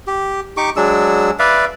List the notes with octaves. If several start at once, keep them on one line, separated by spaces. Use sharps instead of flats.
G4
D#4 G4 C#6 D6
F#3 G#3 D4 E6
B4 D5 E5 F5